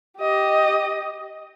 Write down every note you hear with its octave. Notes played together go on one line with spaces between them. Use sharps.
G4 D#5